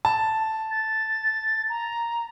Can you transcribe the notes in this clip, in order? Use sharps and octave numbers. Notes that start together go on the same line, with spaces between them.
A5
A6
A#5